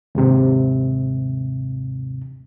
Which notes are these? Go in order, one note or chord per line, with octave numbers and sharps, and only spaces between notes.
D#2 G#2 C3